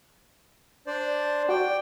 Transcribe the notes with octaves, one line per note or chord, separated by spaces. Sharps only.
D4 C5 D5
F#4 D5 G5